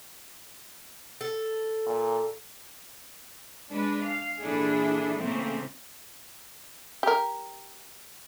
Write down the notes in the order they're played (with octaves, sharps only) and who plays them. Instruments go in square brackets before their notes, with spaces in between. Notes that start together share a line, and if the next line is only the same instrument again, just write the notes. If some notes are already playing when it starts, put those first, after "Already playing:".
[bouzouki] A4
[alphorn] A#2
[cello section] G#3 D4 B4
F5
A#2 E3 D4 E4 G#4 A4
A2 C#3 E3 A3 A#3 C4
[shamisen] G4 A#4